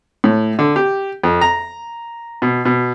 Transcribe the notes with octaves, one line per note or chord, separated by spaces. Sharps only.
A2
D3
G4
F2
A#5
B2
B2